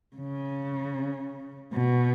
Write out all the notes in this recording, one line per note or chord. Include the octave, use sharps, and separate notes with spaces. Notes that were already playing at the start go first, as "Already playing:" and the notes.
C#3
B2